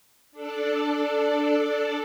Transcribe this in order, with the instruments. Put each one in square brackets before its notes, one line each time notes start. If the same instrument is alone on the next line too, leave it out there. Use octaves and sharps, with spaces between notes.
[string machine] D4 A4 D5